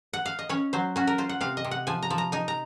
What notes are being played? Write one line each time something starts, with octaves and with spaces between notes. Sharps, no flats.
F#5
F5
D#5
C#4 C#5
F#3 C5
C#4 F#4
A#4
F4 C5
F#5
C3 F5
D#5
C3
F#5
F3 G#5
A#5
F3
A#5
D#4 G#5
A#5